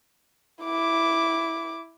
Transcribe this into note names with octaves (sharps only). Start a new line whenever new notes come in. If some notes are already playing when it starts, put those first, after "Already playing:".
E4 D6